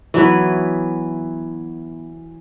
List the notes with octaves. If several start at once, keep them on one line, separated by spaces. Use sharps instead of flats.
E3 F#3 B3 B4